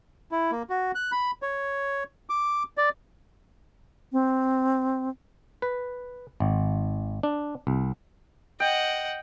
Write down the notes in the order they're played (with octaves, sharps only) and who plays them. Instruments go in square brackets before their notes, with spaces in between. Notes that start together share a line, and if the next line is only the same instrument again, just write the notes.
[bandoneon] E4
A#3
F#4
F#6
B5
C#5
D6
D5
[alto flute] C4
[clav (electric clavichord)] B4
G#1
D4
C2
[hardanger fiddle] D#5 F#5 [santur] G5